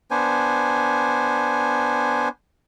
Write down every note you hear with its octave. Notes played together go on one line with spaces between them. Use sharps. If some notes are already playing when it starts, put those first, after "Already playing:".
B3 D4 C5 G#5